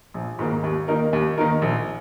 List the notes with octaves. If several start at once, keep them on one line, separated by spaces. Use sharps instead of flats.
A#1
G#2 D#3 A#3
D#2
D#3 A#3 D#4 A#4
D#2
D#3 A#3 D#4 A#4
A#1